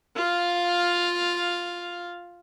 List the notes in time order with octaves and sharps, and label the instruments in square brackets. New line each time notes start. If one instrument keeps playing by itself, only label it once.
[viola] F4 F5